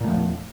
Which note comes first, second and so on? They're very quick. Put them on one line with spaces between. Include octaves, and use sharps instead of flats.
A#2 A3 F3 E2